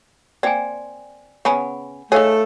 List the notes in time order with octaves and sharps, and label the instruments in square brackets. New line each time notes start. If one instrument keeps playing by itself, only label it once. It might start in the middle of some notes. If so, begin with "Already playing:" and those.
[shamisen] A#3 C4 [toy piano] D5 G5 G#5
[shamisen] C#3 B3 C#4 [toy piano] F#5 G#5 B5
[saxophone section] A3 A4 [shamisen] D#4 G#4 [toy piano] C#5 F5